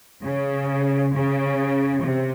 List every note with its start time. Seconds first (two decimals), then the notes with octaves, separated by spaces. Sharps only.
0.23 C#3
1.13 C#3
2.03 C3